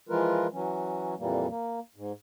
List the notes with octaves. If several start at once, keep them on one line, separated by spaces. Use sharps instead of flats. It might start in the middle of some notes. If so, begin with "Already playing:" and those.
E3 F3 G#3 F4 A#4 B4
E3 F#3 C#4
F2 A#2 E3 G3 A#3
A#3
G#2